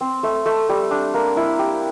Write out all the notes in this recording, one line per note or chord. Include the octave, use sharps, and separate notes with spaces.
C4
A3
A3
G3
D4
A#3
E4
G4